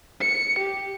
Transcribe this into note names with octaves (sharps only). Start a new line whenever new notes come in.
C#7
G4